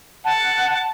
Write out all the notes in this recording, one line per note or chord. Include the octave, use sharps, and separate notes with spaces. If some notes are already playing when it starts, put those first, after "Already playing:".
F#5 A5